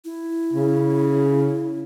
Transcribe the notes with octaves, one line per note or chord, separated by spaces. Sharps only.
E4
C#3